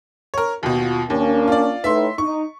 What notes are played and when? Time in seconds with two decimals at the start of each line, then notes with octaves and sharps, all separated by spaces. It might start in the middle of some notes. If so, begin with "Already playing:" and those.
0.34 A#4 C#5
0.63 D#2 B2 F4 F#4
1.10 D#2 A#3 C#4 D4
1.48 F4 D5
1.84 A2 D#4 B4 E5 C6
2.18 D#4 C#6